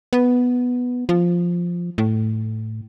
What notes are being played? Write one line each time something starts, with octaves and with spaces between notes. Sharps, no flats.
B3
F3
A2